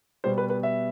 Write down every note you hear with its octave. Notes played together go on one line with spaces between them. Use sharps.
B2 G3 B3 C5
B4
B4
E5